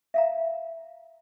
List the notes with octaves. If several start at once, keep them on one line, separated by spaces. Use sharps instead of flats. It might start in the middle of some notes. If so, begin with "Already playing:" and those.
E5 F5 A#5